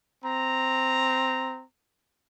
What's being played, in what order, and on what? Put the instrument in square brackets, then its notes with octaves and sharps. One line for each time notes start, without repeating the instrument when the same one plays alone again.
[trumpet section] C4 A#5